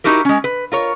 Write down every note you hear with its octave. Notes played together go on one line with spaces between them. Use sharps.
D#4 E4 F#4 G4 A#4
G#3 C#4
B4
F4 A#4 C#5